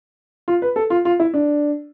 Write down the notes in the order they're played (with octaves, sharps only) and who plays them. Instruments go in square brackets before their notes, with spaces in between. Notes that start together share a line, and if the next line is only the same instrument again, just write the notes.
[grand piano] F4
B4
A4
F4
F4
E4
D4